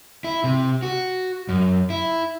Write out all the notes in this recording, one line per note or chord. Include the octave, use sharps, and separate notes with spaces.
E4
C3
F#4
F#2
E4